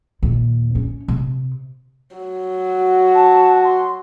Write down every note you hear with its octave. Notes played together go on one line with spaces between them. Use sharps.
D#2 A#2
C#4
C3
F#3
F#4
A5
C6